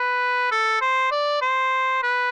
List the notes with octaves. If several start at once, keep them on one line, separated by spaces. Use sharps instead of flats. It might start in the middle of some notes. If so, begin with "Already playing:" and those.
Already playing: B4
A4
C5
D5
C5
B4